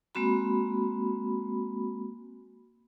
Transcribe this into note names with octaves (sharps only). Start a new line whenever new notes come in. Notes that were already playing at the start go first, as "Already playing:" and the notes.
G#3 A#3 C4 F#4 B5